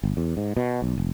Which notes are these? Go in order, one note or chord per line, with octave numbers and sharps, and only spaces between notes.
G1
E2
G#2
B2
B1
F1